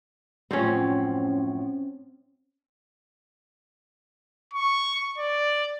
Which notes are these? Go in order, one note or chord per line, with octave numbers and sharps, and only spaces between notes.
F#2 A2 F3 C4 C#4
C#6
D5